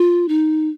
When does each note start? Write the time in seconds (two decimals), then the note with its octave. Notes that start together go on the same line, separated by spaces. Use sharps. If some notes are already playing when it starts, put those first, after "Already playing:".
Already playing: F4
0.28 D#4